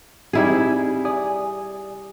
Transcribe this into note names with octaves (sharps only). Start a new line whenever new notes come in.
G3 C4 D#4 E4 G#4
D5 G#5 D#6